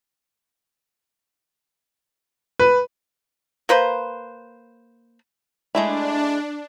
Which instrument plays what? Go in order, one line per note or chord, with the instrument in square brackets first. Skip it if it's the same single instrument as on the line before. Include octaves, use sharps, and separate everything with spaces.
[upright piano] B4
[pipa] A#3 B4 C5
[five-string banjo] G#3 A3 E4 [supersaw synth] D4